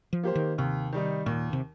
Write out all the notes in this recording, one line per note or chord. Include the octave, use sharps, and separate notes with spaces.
F3
A#3 G4 C5
D#3
D#2 C3
D#3 G3 D#4
D#2 A#2
C3